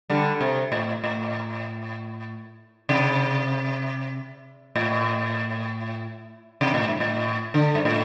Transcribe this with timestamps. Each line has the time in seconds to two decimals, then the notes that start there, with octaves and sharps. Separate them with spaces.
0.10 D3 G3
0.41 C3
0.72 A2
1.04 A2
2.89 C3
4.75 A2
6.61 C3
6.74 A2
6.88 G2
7.00 A2
7.54 D3
7.75 G2
7.85 A2